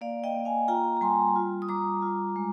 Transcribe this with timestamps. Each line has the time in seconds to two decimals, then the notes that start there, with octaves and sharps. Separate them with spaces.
0.01 A#3 D5 F5
0.24 D#5 G5
0.35 A#3
0.45 F5 G#5
0.68 F4 G5 A#5
0.97 A#5
1.01 G3 G#5 C6
1.36 F4
1.62 D#6
1.69 G3 A#5 D6
2.02 F4
2.36 G#3